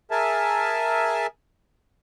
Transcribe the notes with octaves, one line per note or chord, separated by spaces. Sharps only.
G#4 A#4 E5 G#5 A5